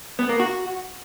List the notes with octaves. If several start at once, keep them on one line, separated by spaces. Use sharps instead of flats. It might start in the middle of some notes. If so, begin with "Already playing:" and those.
B3
A#3
F#4